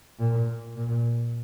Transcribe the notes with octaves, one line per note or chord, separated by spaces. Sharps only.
A#2
A#2